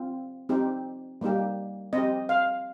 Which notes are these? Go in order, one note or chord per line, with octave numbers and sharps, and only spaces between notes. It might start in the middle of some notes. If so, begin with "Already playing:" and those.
Already playing: C4 F4
C4 D#4 G4
G3 A#3 D#4 G4
C4 G4 D#5
F5